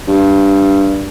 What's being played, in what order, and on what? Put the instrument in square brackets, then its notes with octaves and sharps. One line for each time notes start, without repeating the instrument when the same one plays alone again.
[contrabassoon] G2